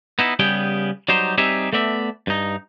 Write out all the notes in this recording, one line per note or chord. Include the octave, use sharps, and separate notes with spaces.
B3 D#4 E4
C#3 G3 B3 G4 G#4 G5
F#3 G3 D#4 G4 C5
G3 C4 D#4 G4 G#4 E5
A3 B3 D5 E5
G2 D#4